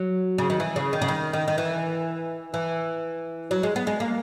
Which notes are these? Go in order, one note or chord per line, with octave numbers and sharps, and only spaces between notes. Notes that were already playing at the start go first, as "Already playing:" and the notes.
Already playing: F#3
C#3
D#3
E3
C#3
D#3
C#3
D#3
D#3
D#3
E3
E3
F#3
G#3
B3
G#3
A#3